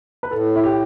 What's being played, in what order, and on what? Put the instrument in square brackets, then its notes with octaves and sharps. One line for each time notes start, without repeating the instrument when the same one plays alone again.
[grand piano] B4
[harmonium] A2 [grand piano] A4
[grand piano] E4
G4